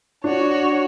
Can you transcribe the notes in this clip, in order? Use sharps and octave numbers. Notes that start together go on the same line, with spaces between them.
D4 F#4 C#5